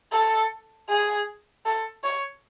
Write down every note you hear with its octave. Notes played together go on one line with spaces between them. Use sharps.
A4
G#4
A4
C#5